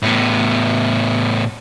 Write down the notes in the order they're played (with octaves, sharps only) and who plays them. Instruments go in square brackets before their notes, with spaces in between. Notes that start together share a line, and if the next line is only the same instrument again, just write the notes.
[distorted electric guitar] A2 B3